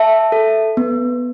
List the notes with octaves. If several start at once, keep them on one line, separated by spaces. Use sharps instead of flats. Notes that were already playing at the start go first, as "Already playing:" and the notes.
Already playing: E5 A5
A4
B3